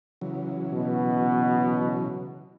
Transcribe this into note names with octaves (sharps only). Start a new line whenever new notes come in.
C#3 E3 F#3
B2